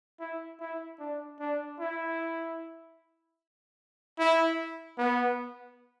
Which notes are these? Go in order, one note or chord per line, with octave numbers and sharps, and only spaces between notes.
E4
E4
D4
D4
E4
E4
B3